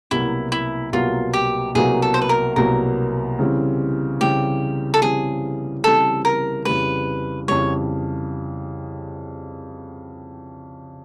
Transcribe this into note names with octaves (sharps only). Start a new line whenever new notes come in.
C2 B2 F#3 A#3 E4
E4
C2 B2 F#3 A#3 F4
G4
C2 B2 F#3 A#3 G#4
A4
C5
B4
A#4
C2 B2 F#3 A#3 A#4
C#3 E3 G3 C4
C#3 E3 G3 C4 G4
A4
C#3 E3 G3 C4 G#4
C#3 E3 G3 C4 A4
A#4
F2 C#3 E3 G3 B4
F2 C#3 E3 G3 C#5